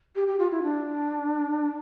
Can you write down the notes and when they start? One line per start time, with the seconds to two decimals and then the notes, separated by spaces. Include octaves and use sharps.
0.16 G4
0.28 G4
0.39 F4
0.51 E4
0.63 D4